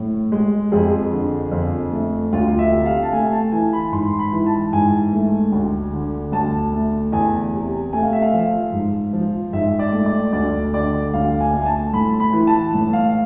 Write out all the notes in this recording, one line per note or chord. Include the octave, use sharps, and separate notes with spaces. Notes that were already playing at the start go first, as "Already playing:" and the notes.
Already playing: A2
G#3
F2 G#4
D3
F2
A3
D2 F4
E5
C3
F5
A5
A3 G#5
A5
E3 G#5
B5
G#2 C6
B5
E3
A5
G#2 G#5
A3
D2
D3
D2 A5
A3
E2 G#5
C3
A3 G#5
F5
E5
F5
F3
G#2
F3
G#2 E5
D5
A3
D5
D2 D5
D3 D5
D2 F5
G#5
A3
G#5
A5
A2 B5
B5
E3
A5
A2
F5